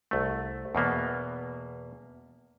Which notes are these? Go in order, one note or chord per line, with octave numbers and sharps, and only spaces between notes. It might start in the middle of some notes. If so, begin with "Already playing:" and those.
C2 A3
E2 B2 A#3 B3